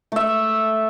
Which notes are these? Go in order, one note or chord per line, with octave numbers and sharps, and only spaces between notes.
A3 E5